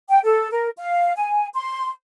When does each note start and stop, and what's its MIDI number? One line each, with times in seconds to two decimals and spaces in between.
0.09 0.20 79
0.24 0.51 69
0.51 0.68 70
0.77 1.13 77
1.16 1.47 80
1.54 1.88 84